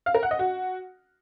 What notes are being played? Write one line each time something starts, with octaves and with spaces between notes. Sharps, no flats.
F5
A#4
F#5
D#5
F#4